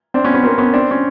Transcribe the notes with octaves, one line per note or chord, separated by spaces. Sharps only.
C4 D4
B3 C#4
B3 C#4
A#3 C4
B3 C#4
C4 D4
C#4